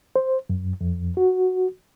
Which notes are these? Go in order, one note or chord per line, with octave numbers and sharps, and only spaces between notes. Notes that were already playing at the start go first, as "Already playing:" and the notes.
C5
F#2
F2
F#4